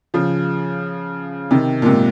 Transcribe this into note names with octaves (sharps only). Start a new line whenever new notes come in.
C#3 F3
C3 D#3
A#2
G#2 C3